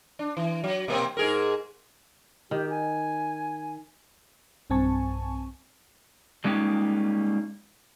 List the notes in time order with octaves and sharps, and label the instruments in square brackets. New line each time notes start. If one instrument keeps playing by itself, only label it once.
[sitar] D4
E3
F#3
B2 A#3 C4
G#2 G#4 A#4
[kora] D#3 [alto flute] G4
[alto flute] G#5
[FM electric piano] B1 G2 C4 G#5 A5 C#6
[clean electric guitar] G3 G#3 A#3 C#4 D#4 G4